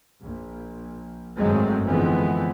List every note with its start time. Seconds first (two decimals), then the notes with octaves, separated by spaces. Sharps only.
0.19 A#1
1.37 G#1 F#2 F#3 G#3 A3 C4
1.86 D3 E3 F3 G#3 B3 C4